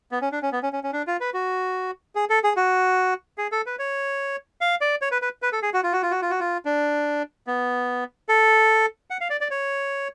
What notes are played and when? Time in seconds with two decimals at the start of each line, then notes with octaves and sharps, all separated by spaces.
0.12 B3
0.22 C#4
0.32 D4
0.42 C#4
0.52 B3
0.63 C#4
0.73 C#4
0.84 C#4
0.93 D4
1.07 F4
1.21 B4
1.34 F#4
2.15 G#4
2.30 A4
2.44 G#4
2.57 F#4
3.38 G#4
3.52 A4
3.66 B4
3.79 C#5
4.61 F5
4.81 D5
5.02 C#5
5.11 B4
5.22 B4
5.42 B4
5.52 A4
5.63 G#4
5.74 F#4
5.83 F4
5.93 F#4
6.03 F4
6.11 F#4
6.22 F4
6.30 F#4
6.40 F4
6.65 D4
7.47 B3
8.29 A4
9.10 F#5
9.21 F5
9.30 D5
9.41 D5
9.51 C#5